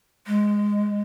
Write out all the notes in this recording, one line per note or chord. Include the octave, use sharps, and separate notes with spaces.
G#3